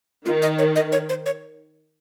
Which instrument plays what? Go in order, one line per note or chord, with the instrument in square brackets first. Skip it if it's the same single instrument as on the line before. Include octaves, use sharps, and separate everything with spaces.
[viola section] D#3 [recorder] F4
[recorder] D#5
C#5
D#5
C#5
C5
C#5